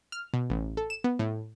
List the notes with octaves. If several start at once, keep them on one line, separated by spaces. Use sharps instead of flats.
F6
B2
A1
A4
E7
B3
A2